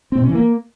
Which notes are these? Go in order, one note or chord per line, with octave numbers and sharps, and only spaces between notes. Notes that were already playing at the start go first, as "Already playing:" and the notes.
C4
B2
C#4
E3
A#3